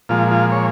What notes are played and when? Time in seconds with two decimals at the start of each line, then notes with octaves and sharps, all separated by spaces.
0.09 A#2 F3 G#3 F4
0.31 F4
0.52 C#5